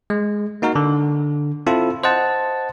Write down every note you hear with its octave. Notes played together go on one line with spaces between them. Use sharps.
G#3
A#3 D#4 F#4 A#4
D3
C4 E4 F4 A4
C5 D#5 F#5 A5